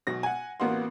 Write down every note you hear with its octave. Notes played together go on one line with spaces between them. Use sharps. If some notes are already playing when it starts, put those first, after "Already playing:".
B1 B2 A#6
F#5 G#5
A1 A#3 B3 F#4 C6